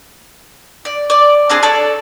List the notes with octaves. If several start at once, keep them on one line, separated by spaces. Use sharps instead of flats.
D5
D5
C4 D4 G#4
A4 C#5 D5